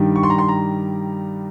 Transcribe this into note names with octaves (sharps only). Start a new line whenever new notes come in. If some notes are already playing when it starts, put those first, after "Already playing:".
Already playing: G2 D#3 G3
C#6
C6
A#5
C6
A#5